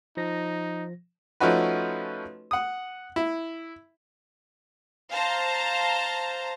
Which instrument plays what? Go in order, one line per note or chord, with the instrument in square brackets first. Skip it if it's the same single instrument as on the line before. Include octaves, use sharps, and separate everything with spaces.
[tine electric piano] F3 A#6 [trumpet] D#4
[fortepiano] F3 A3 C#4 D#4 F#4 B4
F#5 D#6
E4
[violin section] C5 F5 A5 A#5